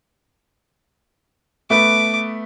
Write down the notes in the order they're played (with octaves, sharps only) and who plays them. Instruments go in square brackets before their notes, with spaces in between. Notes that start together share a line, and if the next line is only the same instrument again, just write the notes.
[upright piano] A3 B3 B4 [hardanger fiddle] D6